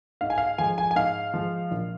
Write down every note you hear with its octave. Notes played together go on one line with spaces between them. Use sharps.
G#2 F5
G#5
F5
F3 G#3 G#5
G#5
G#5
G#2 F5
F3 G#3
A#1